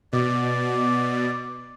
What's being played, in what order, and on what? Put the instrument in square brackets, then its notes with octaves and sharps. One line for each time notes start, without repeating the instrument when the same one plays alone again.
[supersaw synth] B2 [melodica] D5